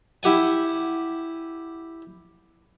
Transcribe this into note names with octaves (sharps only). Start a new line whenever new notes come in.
E4 G4 F#5 G#5